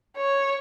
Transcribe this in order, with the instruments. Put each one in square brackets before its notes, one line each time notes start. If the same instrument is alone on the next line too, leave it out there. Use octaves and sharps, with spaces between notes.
[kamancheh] C#5